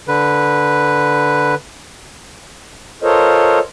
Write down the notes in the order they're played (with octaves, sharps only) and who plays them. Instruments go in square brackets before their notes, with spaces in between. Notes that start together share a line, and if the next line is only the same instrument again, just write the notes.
[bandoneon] D3 B4
[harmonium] F4 A4 A#4 C5 C#5 D#5